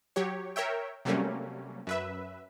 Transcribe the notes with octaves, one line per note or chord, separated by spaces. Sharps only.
F#3 G4 C#5
A#4 C#5 E5 G5
C3 F#3 G3 A3 A#3 C#4
F#2 B4 E5